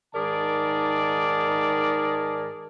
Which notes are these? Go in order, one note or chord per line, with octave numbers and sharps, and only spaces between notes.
G#2 D#3 G#4 A#4 D5 A5